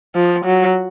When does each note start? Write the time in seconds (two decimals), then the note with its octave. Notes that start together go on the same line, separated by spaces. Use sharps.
0.15 F3
0.45 F#3